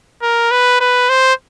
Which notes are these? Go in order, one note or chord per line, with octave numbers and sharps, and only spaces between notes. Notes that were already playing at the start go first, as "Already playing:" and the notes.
A#4
B4
B4
C5